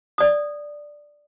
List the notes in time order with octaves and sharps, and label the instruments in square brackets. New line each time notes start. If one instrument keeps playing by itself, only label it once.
[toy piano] D5 D#6